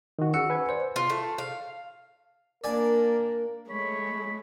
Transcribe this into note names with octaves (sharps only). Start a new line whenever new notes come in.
D#3 F#4
C#4 F#4 G#4 F#5 E6 C#7
B4 G#5 G#6
C5 D5
F4
A3
F5
A#3 D4 A#4 D5 G#5
G#3 A3 C#5 B5